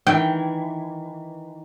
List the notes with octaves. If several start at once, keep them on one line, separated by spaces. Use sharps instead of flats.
D#3 E3 G5